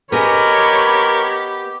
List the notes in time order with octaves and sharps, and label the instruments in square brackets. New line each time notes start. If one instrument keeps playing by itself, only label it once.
[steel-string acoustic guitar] B3 G#4 D#5 [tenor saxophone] G4 [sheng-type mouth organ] A#4 [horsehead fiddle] C#5 B5